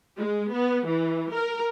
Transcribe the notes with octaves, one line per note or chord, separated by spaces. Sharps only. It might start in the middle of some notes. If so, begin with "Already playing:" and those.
G#3
B3
E3
A#4